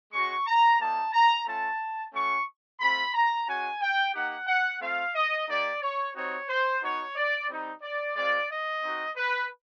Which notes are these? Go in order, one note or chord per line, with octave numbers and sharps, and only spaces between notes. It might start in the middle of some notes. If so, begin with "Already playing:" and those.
G#3 C#4 F#4 C#6
A#5
G3 A#3 D#4 A5
A#5
A3 C#4 F4 A5
A3 C#4 F#4 C#6
A3 C4 F4 B5
A#5
G#3 C#4 F#4 G#5
G5
A#3 D#4 G4 F#5
F#5
A3 C4 F4 F5
D#5
A#3 D#4 G4 D5
C#5
G3 C4 D#4 F#4 C#5
C5
B3 D#4 F#4 C#5
D5
G3 C4 D#4
D5
G#3 C4 F4 D5
D#5
C4 D#4 F#4
B4